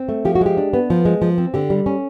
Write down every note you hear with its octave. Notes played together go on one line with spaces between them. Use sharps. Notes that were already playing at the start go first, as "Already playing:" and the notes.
Already playing: C4
A3
F3 G4
F#4
G#3 G4
D4
B3
F3
G#3
F3
C4
D3 G4
G3
C#4